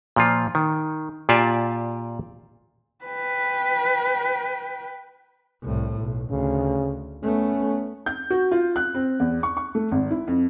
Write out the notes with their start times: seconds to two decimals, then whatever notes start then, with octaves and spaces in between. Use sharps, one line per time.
0.16 A#2 F3 F4
0.55 D#3
1.29 A#2 F4 G4 D5 G#5 A5
3.05 B4 G5
5.62 C2 A2
6.00 B1
6.30 D2 C#3
7.23 A3 B3 C#4
8.06 G6
8.30 F#4
8.52 F4
8.76 F#6
8.95 C4
9.20 E2
9.43 C#6
9.57 C#6
9.75 A3
9.91 G#1
10.11 E4
10.27 F2